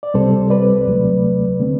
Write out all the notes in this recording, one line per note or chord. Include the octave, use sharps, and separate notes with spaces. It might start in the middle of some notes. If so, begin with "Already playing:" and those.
D5
C2 C3 G3 C4 A4 C5
B4 D5
D2 C3 F#3 A3
D3 A3 C4